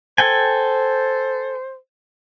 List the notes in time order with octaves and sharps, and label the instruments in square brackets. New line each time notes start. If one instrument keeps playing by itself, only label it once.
[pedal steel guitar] A4 G5 G#5 [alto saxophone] C5